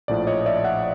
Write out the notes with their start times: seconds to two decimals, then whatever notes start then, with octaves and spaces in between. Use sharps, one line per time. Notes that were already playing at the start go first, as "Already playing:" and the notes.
0.08 A#1 A2 F3 D5
0.27 C#5 D#5
0.41 D#5
0.46 D5 E5
0.64 E5 F#5